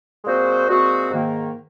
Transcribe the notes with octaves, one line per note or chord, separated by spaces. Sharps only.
A#2 G#3 C4 F#4 C5
A#2 G#3 C4 F#4 C5
G#2 D#3 A#3